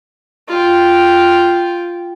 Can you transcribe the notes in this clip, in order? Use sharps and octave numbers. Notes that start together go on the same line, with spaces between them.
F4 G5